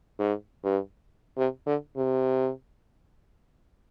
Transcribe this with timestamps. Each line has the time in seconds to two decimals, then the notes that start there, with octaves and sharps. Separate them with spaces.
0.19 G#2
0.64 G2
1.38 C3
1.66 D3
1.97 C3